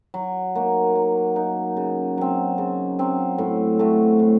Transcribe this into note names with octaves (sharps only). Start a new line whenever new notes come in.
F#3
A#3 D#4 F#4
F#3
A#3 D#4 F#4
C#3
F#3 C4
C#3
F#3 C4
A2
A3 C4 F#4
A2